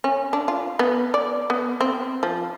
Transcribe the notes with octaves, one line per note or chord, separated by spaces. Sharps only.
C#4
D4
F4
B3
D5
B3
C4
F3